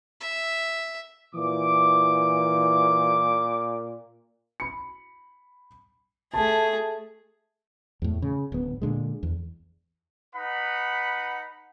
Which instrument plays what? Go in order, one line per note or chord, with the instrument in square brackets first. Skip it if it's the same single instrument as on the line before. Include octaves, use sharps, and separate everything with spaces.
[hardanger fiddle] E5
[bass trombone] A#2 [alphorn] E3 [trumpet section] D6
[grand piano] B5 C#7
[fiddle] A3 G#4 [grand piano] A5
[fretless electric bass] E2 A2
C#3
D1 B3
A#2 D3 G#3
E2
[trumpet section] D#4 B4 F#5 B5